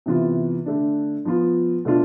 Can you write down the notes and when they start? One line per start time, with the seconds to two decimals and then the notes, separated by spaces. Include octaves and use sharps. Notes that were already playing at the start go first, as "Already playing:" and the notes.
0.06 C3 E3 B3 F4
0.66 D3 A3 D4
1.25 F3 B3 F4
1.85 B2 A3 D4 F4